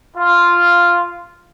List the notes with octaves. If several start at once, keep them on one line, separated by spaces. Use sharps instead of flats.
F4